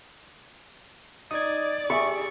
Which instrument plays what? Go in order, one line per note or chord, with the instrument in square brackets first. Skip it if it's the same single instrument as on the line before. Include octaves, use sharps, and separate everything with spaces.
[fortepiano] D#4 [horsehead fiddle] D5 [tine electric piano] D#6 G#6
[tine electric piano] G4 G#4 [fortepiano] E5 [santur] C#6